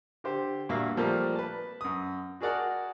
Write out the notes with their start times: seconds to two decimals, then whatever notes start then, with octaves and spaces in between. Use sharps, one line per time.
0.24 D3 G4 C5
0.69 G2 A#2 F#4 E5 F5
0.97 A#2 F3 G3 A3 A#3 C4
1.35 B4 A5
1.81 F#2 D#6
2.41 F#4 G#4 A#4 D5 F#5 A5